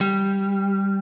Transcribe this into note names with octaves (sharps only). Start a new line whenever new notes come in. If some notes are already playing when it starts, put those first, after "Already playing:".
G3